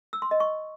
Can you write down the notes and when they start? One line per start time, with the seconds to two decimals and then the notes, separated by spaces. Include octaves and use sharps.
0.13 E6
0.22 C6
0.31 D#5
0.40 C#6